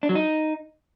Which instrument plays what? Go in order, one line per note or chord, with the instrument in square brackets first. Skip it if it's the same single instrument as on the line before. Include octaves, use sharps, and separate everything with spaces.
[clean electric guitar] D4
F#3
D#4